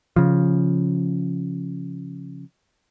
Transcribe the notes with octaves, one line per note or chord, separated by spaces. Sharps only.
C#3 F3